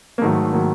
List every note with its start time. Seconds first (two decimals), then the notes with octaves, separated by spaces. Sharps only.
0.18 A#3
0.22 G#2 D#3 F#3 A3
0.53 D#3 F#3 A#3